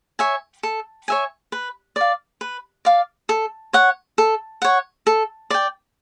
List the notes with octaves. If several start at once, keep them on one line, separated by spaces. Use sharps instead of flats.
C#5 E5 G#5
A4
C#5 E5 G#5
B4
D5 F5
B4
D5 F5
A4
C#5 F#5
A4
C#5 F#5
A4
D5 G5